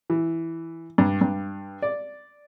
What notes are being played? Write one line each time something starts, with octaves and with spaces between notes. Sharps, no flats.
E3
G2
G2
D5